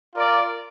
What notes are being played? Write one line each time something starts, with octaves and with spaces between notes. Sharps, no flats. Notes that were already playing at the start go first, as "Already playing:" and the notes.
F4 A#4 D5